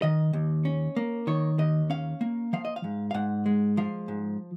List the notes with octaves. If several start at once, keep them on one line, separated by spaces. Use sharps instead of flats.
D#3 D#5
D#2
C#4
A#3
D#3 C#5
D#2 D#5
C#4 F5
A#3
F3 F5
D#5
F5
G#2
F5
G#2 F#5
G#3
F3 F5
G#2